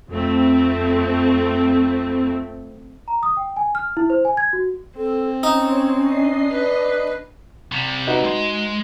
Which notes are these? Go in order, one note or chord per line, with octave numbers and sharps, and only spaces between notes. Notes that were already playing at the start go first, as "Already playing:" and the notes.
F2 A3 C4
A#5
D#6
G5
G#5
F6
E4
C5
G#5
G#6
F#4
C4 A4
C#4 D#4 C#5
D4 D#5 C7
B4
C3 G3
D#4 F#4 B4
G#3 C6